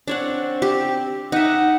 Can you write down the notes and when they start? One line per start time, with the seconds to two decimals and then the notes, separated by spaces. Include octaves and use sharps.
0.08 C4 D4 C#5 F#5
0.62 G4
1.32 D#4 E5 F#5